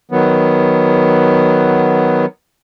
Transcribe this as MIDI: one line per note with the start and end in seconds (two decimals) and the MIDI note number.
0.11 2.26 51
0.11 2.26 54
0.11 2.26 59